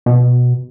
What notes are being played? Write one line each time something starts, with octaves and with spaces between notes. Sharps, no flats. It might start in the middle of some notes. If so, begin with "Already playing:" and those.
B2